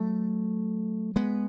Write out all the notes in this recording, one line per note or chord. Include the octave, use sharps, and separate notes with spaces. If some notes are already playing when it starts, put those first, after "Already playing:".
Already playing: F#3 A3
G#3 B3